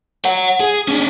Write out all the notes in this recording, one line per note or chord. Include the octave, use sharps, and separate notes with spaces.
C#5 F#5
G#4
C#4 D4